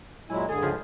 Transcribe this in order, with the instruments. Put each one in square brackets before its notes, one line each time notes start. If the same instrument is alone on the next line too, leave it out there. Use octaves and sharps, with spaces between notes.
[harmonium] A#2 F#3 G#3 [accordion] E4 [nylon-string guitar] G#5
[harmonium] G2 D3 [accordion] G#4 [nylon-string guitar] A4
[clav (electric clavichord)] C#2 F3